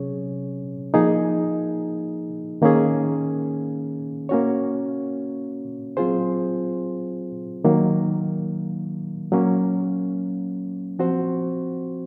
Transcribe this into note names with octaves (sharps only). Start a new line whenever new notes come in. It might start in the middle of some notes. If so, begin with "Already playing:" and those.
Already playing: C3 F#3 C#4 G#4 C#5
F3 A#3 D#4 G#4
D#3 A#3 C#4 G#4
A#3 C#4 F#4 C#5
F#3 C4 F4 G#4 C5
D#3 F#3 A#3
F#3 A#3 C#4
F3 C4 F#4 C5